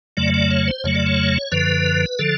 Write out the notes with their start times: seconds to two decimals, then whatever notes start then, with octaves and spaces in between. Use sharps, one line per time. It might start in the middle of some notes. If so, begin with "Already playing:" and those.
0.17 F2 C#3 F#3 A3 D5
0.34 D5
0.51 C#5
0.68 C5
0.84 F2 C#3 F#3 A3 C#5
0.96 D5
1.07 C#5
1.52 F#2 D3 F3 B4
2.19 D3 F3 A4